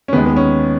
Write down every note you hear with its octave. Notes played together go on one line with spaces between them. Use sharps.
C#4
D#2 D#3 G#3 B3
B3
C#4